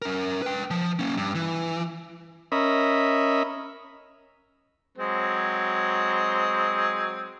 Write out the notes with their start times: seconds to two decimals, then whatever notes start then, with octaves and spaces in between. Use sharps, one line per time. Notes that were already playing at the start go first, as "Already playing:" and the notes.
0.02 C#4 A#4
0.42 B4 G5
0.71 F3
0.99 A#3 C#4
1.17 G2
1.35 E3
2.52 C#4 A#4 D#5 E5 B5
4.98 F#3 G#3 C4